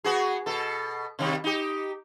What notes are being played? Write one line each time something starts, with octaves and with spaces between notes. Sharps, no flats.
B3 F#4 G#4
B2 A4
C3 D#3 G3
D#4 G4